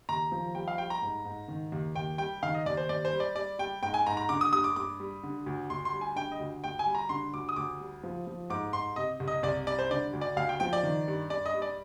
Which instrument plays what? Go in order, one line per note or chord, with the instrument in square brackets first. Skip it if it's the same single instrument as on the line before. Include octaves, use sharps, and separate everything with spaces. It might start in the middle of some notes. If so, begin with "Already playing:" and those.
[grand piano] D#2 A#5
F3
G3 G5
F5
G3 G5
A#5
G#2
G#2
D#3
D#2
D#2 G5
G3 G5
D#3 F5
D#5
D#2 D5
C5
D#2 D5
C5
G3
D5
G3 D5
G3 G5
G#2 G5
G#5
G#2 A#5
A#5
D3 D6
D#6
G2 D#6
D6
G2 D6
G3
D3
D2
D2 C6
C6
G3
G#5
D3 G5
D#5
D2
D2 G5
G#5
G3
A#5
D3 C6
D2 D6
D#6
D2 D6
G3
F3
F3
G#2 D6
G#2 C6
C3 D#5
C2
D#5
C2 D5
G3 D5
C5
D3 D5
D2
D5
D2 F5
G5
F3 G5
D5
D#3
G2
G2 D5
D#5
G3
D5